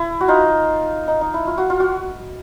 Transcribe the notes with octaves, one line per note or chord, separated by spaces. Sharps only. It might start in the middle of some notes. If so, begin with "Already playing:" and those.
Already playing: E4
F#4
D#4 F4
D#4
D#4
E4
F4
F#4
F4
F#4